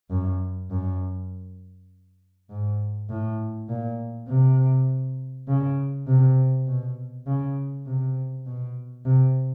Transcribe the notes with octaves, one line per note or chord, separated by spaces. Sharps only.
F#2
F#2
G#2
A2
A#2
C3
C#3
C3
B2
C#3
C3
B2
C3